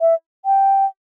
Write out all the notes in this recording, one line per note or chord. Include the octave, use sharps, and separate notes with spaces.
E5
G5